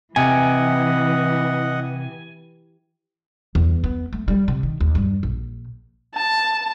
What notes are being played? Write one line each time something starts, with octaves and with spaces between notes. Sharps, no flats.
C3 E3 D#5 F#5 G#5
E2
B3
A3
G3
C3
D#3
D#2
G2
A#1
A5